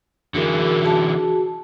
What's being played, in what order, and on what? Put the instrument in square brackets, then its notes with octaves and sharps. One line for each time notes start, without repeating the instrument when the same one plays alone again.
[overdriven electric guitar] D3 E3 [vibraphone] F#4 G#4 A#4
[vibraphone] F#4 G#4 A5